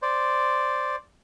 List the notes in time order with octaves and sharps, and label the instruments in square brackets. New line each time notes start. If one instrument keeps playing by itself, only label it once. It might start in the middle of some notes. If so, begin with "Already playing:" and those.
[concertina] C5 D5